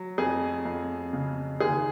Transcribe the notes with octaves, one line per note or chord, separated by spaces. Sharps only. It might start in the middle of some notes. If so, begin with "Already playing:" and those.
Already playing: F#3
F2 G#4
F2
C#3
D#2 G#4